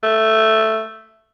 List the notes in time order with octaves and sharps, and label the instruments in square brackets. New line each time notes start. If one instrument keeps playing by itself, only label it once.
[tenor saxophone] A3